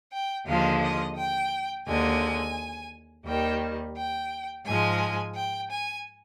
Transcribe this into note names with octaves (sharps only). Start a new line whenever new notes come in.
G5
D#2 D3 F3 G#3 F5
D#5
G5
D#2 D3 G#3 G#5
D#2 D#3 G3 G5
G5
G#2 F3 G#3 G#5
G5
G#5